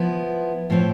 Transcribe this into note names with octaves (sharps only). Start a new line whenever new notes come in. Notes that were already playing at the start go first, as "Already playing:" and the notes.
Already playing: F3 B3 E4
A2 F3 C4 E4